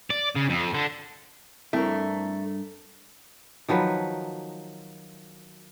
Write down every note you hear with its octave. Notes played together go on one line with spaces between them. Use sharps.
D5
C#3
F2
D3
G2 A3 C4 E4 A#4
D#3 F3 F#3 B4